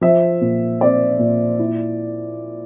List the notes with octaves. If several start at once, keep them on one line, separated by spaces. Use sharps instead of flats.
F3 E5
A#2
C4 D5
A#2
E4